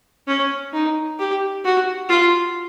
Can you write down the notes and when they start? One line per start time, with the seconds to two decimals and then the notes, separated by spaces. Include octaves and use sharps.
0.27 C#4
0.73 D#4
1.19 G4
1.64 F#4
2.09 F4